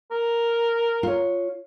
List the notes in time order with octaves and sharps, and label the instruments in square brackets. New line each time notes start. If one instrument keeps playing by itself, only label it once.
[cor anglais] A#4
[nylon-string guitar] F4 C#5